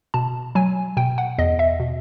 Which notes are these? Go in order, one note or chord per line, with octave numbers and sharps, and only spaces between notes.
B2 A5
F#3 G#5
B2 G5
F#5
E2 D#5
E5
B2